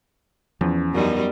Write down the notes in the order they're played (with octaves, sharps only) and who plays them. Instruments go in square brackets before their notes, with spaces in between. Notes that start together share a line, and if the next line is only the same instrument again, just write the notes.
[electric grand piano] E2 [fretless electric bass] F3 [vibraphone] C#4
[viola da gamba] F#2 G3 D#4 [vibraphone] B3 A#4